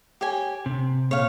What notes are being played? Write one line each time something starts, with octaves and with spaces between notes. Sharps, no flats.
G4 C#5 G#5
C3
A#2 C#5 F5